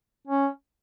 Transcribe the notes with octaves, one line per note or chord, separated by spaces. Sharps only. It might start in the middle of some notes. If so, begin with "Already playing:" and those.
C#4